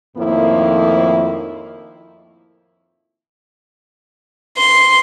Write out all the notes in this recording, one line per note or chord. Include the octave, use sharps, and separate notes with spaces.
F2 A2 D#3 F3 A#3 E4
C6